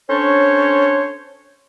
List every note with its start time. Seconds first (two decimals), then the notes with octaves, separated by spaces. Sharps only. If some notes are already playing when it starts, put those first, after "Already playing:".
0.08 C#4 D4 A4 C5 C#5